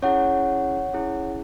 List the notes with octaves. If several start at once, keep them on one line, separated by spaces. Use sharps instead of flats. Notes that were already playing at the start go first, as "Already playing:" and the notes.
C#4 E4 G#4 C#5 F#5
C#4 E4 G#4